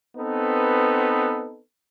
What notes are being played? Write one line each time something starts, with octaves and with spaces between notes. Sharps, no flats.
B3 C4 D#4 A4 B4